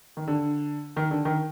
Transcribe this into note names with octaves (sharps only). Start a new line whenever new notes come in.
D#3
D3
D#3
D3
D#3